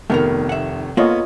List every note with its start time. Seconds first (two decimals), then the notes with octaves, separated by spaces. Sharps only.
0.10 F1 D#3 A3 B3 A#4
0.49 E5 F#5
0.97 A#3 B3 F4 A4 C#5 D#5